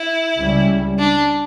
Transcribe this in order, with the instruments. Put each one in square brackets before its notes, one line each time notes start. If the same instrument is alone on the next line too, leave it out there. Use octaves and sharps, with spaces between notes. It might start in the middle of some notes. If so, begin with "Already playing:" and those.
Already playing: [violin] E4
[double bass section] C#2 C#3 G3 C#4
[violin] D4